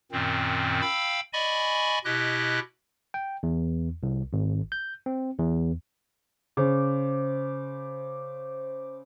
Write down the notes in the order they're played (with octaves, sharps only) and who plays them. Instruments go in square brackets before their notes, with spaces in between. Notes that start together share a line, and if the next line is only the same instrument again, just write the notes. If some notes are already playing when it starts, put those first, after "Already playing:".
[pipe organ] F#2 A#2 D#3 C4
F5 G5 B5 E6
D5 D#5 G#5 B5 C#6
B2 E4 G4 D#5 F#6
[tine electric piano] G5
E2
C2
G#1
G6
C4
E2
[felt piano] C#3 [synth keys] C5 D6